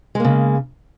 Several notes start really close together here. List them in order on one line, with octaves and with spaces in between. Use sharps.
G#3 A#3 C#3